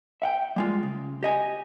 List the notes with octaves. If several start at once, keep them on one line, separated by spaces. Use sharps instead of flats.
E5 F#5 G5
G3 G#3 F4
C#3
G4 D#5 G#5